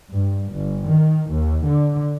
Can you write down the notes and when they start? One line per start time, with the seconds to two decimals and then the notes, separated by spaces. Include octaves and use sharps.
0.11 G2
0.51 G1
0.86 D#3
1.30 D#2
1.65 D3